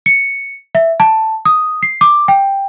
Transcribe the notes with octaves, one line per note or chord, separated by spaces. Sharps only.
C#7
E5
A5
D#6
C7
D6
G5